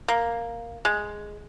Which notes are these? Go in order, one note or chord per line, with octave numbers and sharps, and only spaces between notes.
A#3
G#3